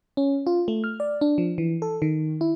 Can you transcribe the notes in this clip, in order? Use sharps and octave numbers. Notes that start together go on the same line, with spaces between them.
C#4
F4
A3
F6
D5
D4
F3
E3
A4
D#3
E4